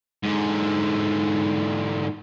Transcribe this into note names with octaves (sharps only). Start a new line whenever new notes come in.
G#2 D3